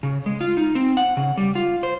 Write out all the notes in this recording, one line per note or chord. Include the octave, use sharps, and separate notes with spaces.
C#3
G#3
F4
D#4
C4
F#5
C#3
G3
F4
C5